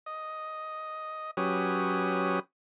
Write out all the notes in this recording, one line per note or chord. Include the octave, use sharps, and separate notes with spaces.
D#5
F#3 C#4 G4 B4 D#6